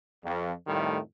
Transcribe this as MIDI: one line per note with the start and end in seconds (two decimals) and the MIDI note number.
0.24 0.52 41
0.67 0.99 41
0.67 0.99 45
0.67 0.99 51
0.67 0.99 55
0.67 0.99 57